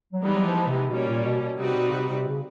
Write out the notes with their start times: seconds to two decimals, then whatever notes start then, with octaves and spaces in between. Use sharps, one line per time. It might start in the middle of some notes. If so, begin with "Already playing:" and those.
0.13 F#3
0.23 E3 G3 G#3 B3 D#4 G4
0.33 F#3
0.45 F3
0.68 C3
0.90 B2 G3 A#3 C#4
1.08 A#2
1.24 B2
1.42 B2
1.58 C3 G3 C4 D#4 F#4 B4
1.75 B2
1.87 C#3
1.92 C3
2.09 C3
2.27 C#3